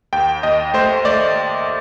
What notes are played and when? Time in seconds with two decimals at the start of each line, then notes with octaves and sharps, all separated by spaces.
0.13 D#2 G5
0.43 D#2 D#5
0.74 A3 C5
1.05 A3 D5